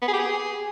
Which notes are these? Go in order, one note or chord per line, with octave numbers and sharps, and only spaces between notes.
B3
G#4
G4
G#4